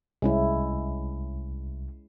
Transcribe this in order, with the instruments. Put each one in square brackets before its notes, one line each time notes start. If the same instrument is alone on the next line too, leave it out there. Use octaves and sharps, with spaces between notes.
[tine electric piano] C2 [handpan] G#3 C#4 E4